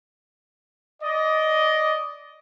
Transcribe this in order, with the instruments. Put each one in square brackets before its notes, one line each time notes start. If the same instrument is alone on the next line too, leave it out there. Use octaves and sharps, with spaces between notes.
[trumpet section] D5 D#5